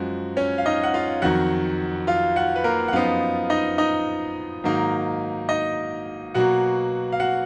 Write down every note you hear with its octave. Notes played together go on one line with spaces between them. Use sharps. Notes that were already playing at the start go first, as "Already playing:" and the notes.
Already playing: F#2 F3 G#3 F#4
C#4 C#5
F5
D#4 D#5
F#5
F4 F5
F2 D#3 F#3 F#4 F#5
F4 F5
F#4 F#5
B4
A#3 A#4
F#5
F#2 F3 B3 D#4 F4 F5
D#4 D#5
D#4 D#5
G#2 D#3 F#3 A#3 D#4
D#4 D#5
B2 F#3 A#3 F#4 F#5
F5
F#4 F#5